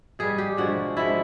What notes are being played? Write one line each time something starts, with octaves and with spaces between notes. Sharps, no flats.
B2 G3 G#4
G4
D3 F3 G#3 F#4
D3 F3 G#3 E4